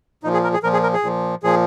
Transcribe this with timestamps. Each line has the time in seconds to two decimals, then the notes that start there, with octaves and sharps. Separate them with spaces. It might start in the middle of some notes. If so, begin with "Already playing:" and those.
0.23 A#2 F3 D#4
0.33 G#4
0.44 A#4
0.54 G#4
0.63 A#2 F3 A#4
0.73 G#4
0.83 A#4
0.93 G#4
1.03 A#2 F3
1.43 A#2 F3 G#4